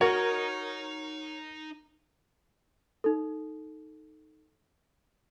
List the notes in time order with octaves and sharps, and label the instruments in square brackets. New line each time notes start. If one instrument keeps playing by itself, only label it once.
[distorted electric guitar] D#4 A#5 [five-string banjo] F#4 [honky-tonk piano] A#4 [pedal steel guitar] C#5
[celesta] D#4 A4